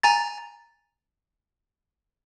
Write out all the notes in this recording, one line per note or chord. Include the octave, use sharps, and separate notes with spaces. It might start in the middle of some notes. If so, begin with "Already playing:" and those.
G#5 A#5 A6